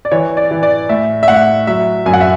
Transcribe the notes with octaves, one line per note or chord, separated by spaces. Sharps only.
D5
E3 C#5
D5
E3
D5
A2 E5
E5
A2 F#5
F#3 E5
F#2 G#5
F#5
E5